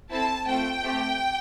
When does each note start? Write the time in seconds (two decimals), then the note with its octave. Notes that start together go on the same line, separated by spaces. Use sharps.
0.11 C4 E4 A4 A5
0.48 A3 C4 F4 A4 G5
0.83 A3 C4 G4